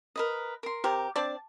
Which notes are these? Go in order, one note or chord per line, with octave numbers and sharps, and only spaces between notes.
A#4 B4 D#5
A#4 C6
C3 G4 A#4
C4 D4 D5 A5